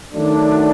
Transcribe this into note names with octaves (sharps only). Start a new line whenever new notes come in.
D#3 F#3 A3 D4